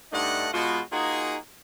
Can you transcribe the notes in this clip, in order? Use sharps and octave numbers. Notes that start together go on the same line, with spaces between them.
G2 A3 D4 D#4 D#5 F#5
B2 G#3 B3 F4 F#4
A#3 D#4 F4 F#4 G#4